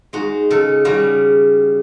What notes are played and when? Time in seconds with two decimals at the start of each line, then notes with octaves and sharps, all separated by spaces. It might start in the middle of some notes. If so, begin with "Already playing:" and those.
0.13 G#3 D#4 F#4
0.50 C#3 A4
0.85 C#3 G3 F#4